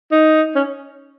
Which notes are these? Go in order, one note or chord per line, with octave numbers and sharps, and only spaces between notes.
D#4
C#4